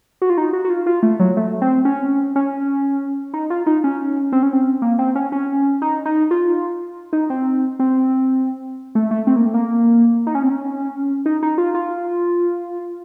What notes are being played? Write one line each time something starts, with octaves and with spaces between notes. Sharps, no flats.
F#4
F4
D#4
F#4
F#4
F4
F4
A3
F#3
A3
C4
C#4
C#4
D#4
F4
D#4
C#4
C4
C#4
C4
A#3
C4
C#4
C#4
D#4
D#4
F4
D#4
C4
C4
A3
A3
C4
A#3
A3
A#3
D#4
C#4
C4
C#4
D#4
D#4
F4
F4